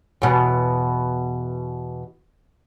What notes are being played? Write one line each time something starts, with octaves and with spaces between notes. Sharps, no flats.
E2 B2